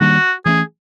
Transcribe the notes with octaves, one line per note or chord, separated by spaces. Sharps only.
D#3 G3 A#3 D4 F#4
E3 A3 C#4 G#4